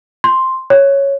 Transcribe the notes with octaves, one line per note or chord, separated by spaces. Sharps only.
C6
C#5